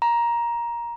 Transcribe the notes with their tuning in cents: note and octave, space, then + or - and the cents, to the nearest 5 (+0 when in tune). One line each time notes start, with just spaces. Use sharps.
A#5 +15